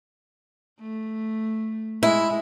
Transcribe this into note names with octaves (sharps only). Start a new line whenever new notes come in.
A3
G#3 E4